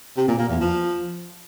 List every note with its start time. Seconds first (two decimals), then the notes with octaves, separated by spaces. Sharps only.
0.17 C3
0.28 A#2
0.39 A#3
0.50 E2
0.61 F3